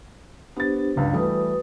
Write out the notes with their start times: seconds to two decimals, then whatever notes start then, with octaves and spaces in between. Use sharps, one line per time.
0.57 B3 D4 G4 C5 A6
0.96 F#1 C#2 G2
1.13 E3 G3 A3 F#4 B4 D#6